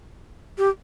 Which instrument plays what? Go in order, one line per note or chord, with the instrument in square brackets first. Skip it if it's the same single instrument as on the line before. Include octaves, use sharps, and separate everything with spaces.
[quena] G4